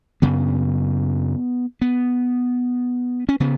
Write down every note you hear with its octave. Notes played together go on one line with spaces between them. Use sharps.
F#2 C#3 B3
B3
C#4
C#3 B3